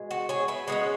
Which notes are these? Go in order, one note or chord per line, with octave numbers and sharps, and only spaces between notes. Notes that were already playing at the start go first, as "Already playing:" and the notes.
Already playing: B2 G#3
F#4
G#4 C#5
B4 E5
B2 G#3 C#4 C#5 F#5